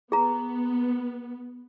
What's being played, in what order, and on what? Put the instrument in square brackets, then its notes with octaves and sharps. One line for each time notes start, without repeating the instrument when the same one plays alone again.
[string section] B3 [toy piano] G#4 A#5